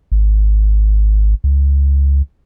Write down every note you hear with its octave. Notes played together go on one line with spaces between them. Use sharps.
G#1
C#2